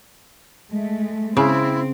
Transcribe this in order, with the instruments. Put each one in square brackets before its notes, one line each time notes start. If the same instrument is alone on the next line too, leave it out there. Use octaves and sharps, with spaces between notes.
[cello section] G#3 A3
[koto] C#3 [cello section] C4 [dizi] E4